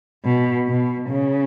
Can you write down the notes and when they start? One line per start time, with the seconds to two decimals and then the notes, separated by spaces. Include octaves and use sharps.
0.25 B2
0.68 B2
1.09 C#3